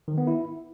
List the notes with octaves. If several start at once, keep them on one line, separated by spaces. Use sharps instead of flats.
D#3
B3
E4